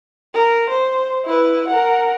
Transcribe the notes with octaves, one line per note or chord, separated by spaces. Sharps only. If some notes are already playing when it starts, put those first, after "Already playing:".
A#4
C5
E4 B4
A#4 F#5